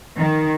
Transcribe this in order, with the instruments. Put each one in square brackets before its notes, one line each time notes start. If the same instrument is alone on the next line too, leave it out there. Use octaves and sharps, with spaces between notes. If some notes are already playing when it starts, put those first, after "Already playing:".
[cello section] D#3